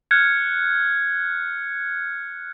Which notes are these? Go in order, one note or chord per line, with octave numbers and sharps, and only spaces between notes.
F6 F#6 G#6 C#7